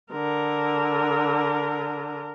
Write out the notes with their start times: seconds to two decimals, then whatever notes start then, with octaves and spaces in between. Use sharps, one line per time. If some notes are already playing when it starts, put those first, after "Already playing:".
0.12 D3 A#4